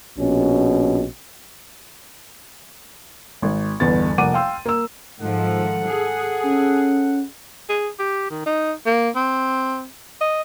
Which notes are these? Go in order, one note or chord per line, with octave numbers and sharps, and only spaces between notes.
A#1 B2 C#4
G#1
G1 E2 B3 A6
F1 A#3 F#5 D6 D#7
F5 G5 C6 E6
A#3 E6
G#2 D#3 F3 A4 F#5
G#4
C#4
G#4
G4
D#3
D#4
A#3
C4
D#5